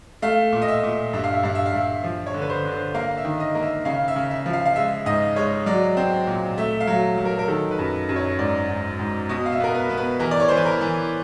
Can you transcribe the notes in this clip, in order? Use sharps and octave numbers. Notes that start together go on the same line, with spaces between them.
A3 F5
A#2
D#5
E5
A#2
G2 E5
F5
E5
G2 F5
E5
F5
G2 E5
F3
C#5
D3
B4
C5
D3
C5
A#3 F5
E5
D#3
D#5
A#3
E5
C#3 F5
E5
C#3
E5
F3
F5
F5
G#3 E5
G#2 D#5
G#3 C#5
F#3 D5
C4
A#2
A3 E5
F5
F#3
F#3
A#4
A#4
D#3 A4
B4
F#2
F#2
C#5
G#2 D5
G#2
G#2
B2 D#5
F5
E5
B3 A#4
B4
B3
B4
E3 A#4
D5
C#5
E3 C5
B4
A#4
E3